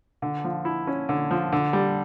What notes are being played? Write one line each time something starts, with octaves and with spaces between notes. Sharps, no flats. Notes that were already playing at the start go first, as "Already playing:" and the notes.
D3
F3
E4
C#4
D3
F3
D3
G3